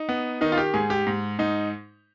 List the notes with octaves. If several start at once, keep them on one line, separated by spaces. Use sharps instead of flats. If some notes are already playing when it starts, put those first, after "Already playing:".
Already playing: D#4
B3
D#3 D#4
F4
G4
G#2 G#4
G4
G#2
G#2 D#4